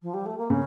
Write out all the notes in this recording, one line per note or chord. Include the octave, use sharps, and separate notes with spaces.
F3
G3
A3
A#3
C#3 C#4